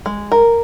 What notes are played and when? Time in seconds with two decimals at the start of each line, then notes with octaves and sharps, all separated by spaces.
0.06 G#3
0.32 A#4